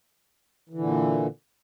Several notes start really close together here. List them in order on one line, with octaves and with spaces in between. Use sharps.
E3 D3 A#2